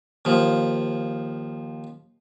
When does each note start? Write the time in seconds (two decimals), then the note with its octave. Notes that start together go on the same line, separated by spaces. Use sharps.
0.25 D#2 F3